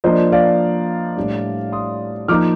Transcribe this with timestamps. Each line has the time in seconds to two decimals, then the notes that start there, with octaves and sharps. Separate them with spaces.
0.04 F3 A#3 D4 C5 D#5
0.32 D5 F5
1.16 A2 G3 D4
1.73 C6 D#6
2.28 F3 A#3 D#4 D6 F6